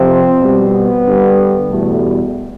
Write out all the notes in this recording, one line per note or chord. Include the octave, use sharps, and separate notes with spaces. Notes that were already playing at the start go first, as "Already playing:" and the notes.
Already playing: F2 C3 F3 C4
B2 G3
B3
G2 D3 G3
E2 B2 G3 A3